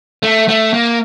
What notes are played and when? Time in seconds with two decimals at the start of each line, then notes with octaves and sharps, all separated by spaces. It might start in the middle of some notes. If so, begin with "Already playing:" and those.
0.23 A3
0.48 A3
0.73 A#3